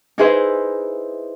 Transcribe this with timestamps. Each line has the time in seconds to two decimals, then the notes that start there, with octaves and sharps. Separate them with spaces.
0.18 D#4 E4 G#4 B4 C5 E5